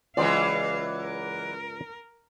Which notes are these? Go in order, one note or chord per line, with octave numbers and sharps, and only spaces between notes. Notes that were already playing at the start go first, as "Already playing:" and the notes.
C#2 E3 F#3 G#3 C5 D5 F5
A#4